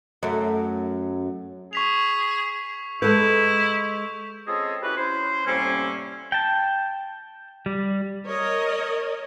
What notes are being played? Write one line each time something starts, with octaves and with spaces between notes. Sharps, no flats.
F#2 A3
G#4 C#6 B6 F7
G#3 E4 A4 B4 G6
C4 C#4 F4 G#4 A4 D#5
C#4 E4 F#4 G4 B4
C#4 E4 C5
A2 C3 G3 A#3 C4 C#4
G5 A5
G3
A#4 C#5 D#5